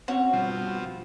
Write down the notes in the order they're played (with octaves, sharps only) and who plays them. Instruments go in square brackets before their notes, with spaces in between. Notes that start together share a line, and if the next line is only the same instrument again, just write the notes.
[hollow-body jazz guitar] C4 C#4 C5 [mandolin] F#4
[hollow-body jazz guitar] G2 [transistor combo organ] B2 F3 C4